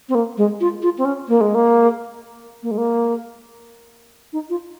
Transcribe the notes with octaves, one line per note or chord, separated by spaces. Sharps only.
C4
A#3
G#3
F4
F4
C4
C#4
A#3
G#3
A#3
A#3
G#3
A#3
D#4
F4